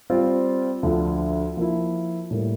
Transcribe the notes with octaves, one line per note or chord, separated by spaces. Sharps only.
G3 C4 F4
D2 D3 F3
F3 A#3 E4
A2 G3 A#3